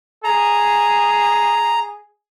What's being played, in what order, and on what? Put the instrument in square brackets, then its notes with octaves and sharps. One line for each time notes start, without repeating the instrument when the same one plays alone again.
[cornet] G#4 [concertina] A#5